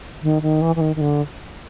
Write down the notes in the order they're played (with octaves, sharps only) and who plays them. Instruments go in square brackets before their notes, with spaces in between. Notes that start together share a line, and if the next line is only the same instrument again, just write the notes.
[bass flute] D#3
D#3
E3
E3
D#3
D#3
D3